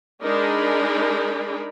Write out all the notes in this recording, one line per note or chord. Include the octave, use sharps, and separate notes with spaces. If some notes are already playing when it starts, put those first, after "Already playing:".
G#3 D4 D#4 G#4 A#4 B5